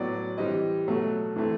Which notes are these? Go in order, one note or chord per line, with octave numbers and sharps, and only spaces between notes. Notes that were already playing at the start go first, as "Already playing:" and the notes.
Already playing: A2 F#3 B3 D5
E3 G3 C4 D#5
B2 F#3 A3
E3 A3 C4